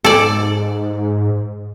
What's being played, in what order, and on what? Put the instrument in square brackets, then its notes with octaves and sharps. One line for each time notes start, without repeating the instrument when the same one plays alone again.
[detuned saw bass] G#2 [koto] A4 D5